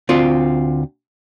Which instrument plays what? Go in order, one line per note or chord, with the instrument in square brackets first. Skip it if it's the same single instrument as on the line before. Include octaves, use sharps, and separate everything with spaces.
[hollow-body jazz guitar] D2 C4 F4